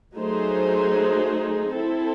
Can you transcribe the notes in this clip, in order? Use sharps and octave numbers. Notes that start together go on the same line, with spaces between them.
F#3 A3 D#4 G#4 C5
C4 E4 A4